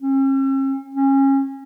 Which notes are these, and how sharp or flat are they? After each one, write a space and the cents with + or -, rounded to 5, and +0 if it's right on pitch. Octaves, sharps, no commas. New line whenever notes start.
C#4 -45
C#4 -25